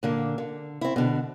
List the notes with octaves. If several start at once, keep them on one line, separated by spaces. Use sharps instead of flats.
A#2 D3 A#3
D3
C4 E4
B2 D3